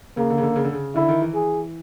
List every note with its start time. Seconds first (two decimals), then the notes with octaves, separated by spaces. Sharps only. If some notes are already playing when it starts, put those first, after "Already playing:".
0.17 C#3 A#3
0.30 D3
0.38 C#3
0.43 D3
0.56 C#3
0.64 D3
0.73 C#3
0.95 D3 E4
1.09 D#3
1.22 E3
1.34 G#4